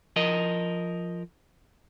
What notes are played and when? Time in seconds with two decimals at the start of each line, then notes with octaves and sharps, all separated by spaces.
0.16 F3 A#4 D#5